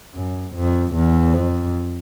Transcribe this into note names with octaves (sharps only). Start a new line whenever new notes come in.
F#2
F2
E2
F2